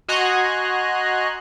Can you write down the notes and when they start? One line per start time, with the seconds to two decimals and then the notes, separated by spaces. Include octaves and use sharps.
0.08 F#4 D#5 G#5 A#5 C6 F#6